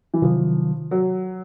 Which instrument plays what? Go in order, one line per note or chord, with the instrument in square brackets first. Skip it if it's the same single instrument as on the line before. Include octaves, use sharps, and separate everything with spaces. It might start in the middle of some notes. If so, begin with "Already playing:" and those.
[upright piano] E3
[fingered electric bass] C3 D#3 F#3 [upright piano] F3
[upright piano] F#3